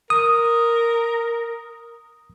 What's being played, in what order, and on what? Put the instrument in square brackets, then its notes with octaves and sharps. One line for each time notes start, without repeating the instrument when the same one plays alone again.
[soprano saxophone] A#4 [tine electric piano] D#6